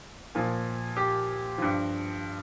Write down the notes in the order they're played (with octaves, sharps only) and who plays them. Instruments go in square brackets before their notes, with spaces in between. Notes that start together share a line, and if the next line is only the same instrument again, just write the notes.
[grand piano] A#2 F3
G4
G2 F3